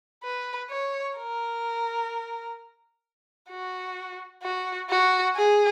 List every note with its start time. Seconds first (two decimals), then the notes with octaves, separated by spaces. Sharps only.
0.24 B4
0.70 C#5
1.17 A#4
3.50 F#4
4.43 F#4
4.90 F#4
5.36 G#4